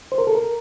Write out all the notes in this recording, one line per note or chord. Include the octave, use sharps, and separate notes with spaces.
C5
A#4
A4
A#4